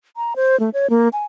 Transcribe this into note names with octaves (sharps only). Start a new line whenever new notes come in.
A#5
C5
A3
C#5
A#3
G#5